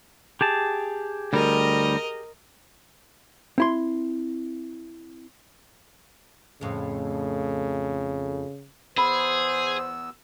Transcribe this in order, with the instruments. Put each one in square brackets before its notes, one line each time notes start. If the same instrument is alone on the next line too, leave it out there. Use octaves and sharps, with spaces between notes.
[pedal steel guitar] G4 G#4 A5
[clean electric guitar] D2 G3 [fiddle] A#4 D#5
[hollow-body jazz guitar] C4 E4 C6
[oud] F2 A2 [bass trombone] C#3
[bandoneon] E2 B3 E6 [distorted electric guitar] G#4 [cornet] C5 [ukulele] B5